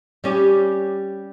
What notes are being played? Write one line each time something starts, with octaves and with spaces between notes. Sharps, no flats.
G3 C#4 G4